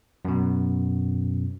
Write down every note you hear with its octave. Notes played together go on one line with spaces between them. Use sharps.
F#2 B2